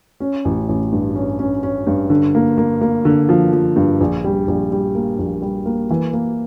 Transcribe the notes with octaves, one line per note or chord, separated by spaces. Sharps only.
C#4
A1
A1
G2
C#4
C#4
C#4
G2
D3
A#3
A#3
A#3
D3
F3
F3
G2
A#1
G3
A#1
G3
A#3
A#1
G3
A#3
E3
A#3